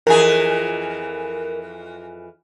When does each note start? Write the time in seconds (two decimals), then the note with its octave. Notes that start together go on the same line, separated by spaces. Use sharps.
0.07 F2 E3 G#4 A#4